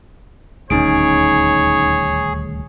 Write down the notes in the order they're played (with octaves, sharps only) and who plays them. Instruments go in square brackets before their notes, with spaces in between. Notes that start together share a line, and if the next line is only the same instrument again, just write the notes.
[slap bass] D#1 D2 [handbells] C#4 D#4 D7 [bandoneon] G#4 [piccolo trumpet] C#5